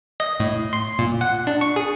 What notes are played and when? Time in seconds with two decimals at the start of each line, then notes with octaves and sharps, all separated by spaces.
0.20 D#5
0.40 A2
0.73 C6
0.99 A#2
1.21 F#5
1.47 D4
1.61 C#6
1.76 G#4